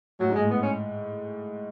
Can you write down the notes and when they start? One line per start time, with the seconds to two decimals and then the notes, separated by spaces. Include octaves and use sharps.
0.19 A2 F#3
0.30 G#2
0.35 G#3
0.41 A2
0.51 B3
0.63 C#4